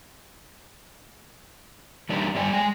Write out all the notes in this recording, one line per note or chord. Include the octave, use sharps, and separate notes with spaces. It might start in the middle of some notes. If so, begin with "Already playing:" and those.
E3 G3 D4 D#4 G4 A#4
G2 G3 D5 G5 G#5
G#3 G#5